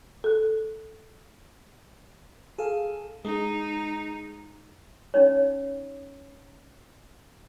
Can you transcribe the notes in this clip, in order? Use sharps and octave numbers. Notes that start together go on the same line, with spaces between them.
A4 F#6
G#4 A4 F5
G#3 D#4
C#4 D#4 C#5